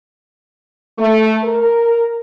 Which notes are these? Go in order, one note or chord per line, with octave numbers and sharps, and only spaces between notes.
A3
A#4